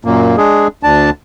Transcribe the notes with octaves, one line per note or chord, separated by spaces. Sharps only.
F#2 A#2 A#3
G#3 D4 G#4
D2 D4 A5